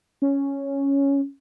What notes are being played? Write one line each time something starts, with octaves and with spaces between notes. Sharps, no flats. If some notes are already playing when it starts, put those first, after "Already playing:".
C#4